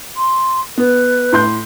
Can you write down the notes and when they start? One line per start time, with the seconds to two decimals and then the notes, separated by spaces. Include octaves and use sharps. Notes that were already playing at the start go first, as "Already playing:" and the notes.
0.17 C6
0.78 B3 B4
1.32 A2 C6 G6